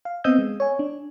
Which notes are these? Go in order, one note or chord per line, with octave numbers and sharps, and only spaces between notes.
F5
B3 C4 D#5 D#6 E6 G6
G#3
C#5 G#5
D4